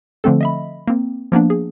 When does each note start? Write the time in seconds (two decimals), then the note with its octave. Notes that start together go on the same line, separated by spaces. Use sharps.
0.24 D3 F3 A3 C4 A4
0.41 D#5 E5 B5
0.88 A#3 C4
1.32 F3 A#3 B3 D4
1.50 G#4